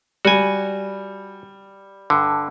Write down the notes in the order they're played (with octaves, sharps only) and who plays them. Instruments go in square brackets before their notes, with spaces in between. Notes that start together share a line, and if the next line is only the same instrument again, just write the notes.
[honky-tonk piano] G3 [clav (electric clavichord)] F#4 G#5
[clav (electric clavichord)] G2 D3